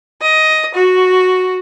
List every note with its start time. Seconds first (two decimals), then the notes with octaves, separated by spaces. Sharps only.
0.22 D#5
0.75 F#4